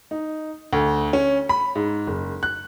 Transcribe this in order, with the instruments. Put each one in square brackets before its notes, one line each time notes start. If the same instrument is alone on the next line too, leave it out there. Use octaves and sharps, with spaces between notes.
[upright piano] D#4
D2
C#4
B5
G#2
F#1
F#6